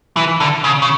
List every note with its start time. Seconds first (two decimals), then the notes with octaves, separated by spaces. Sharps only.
0.16 E3
0.40 D3
0.64 C#3
0.82 C#3